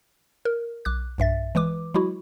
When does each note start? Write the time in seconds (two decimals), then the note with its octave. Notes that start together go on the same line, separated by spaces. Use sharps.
0.45 A#4
0.85 B1 D6 F#6
1.18 B1 G2 E5 A6
1.55 E3 G#3 B4 D6
1.94 F#3 G#3 E4 F#4